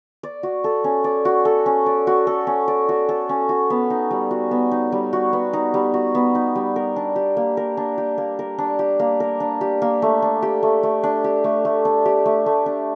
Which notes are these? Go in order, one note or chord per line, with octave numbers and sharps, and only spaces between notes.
D5
F#4
A4
C#4
D5
F#4
A4
C#4
D5
F#4
A4
C#4
D5
F#4
A4
C#4
F#4
B3
D#4
G3
F#4
B3
D#4
G3
F#4
B3
D#4
G3
F#4
B3
D#4
G3
A#4
D4
G4
A#3
A#4
D4
G4
A#3
A#4
D4
G4
A#3
A#4
D4
G4
A#3
A3
D4
G4
A3
A3
D4
G4
A3
A3
D4
G4
A3
A3
D4